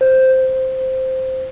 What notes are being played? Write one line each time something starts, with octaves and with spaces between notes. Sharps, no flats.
C5